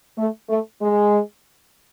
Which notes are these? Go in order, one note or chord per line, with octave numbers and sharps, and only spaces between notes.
A3
A3
G#3